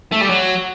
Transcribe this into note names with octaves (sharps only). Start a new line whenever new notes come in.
A3
G3
F#3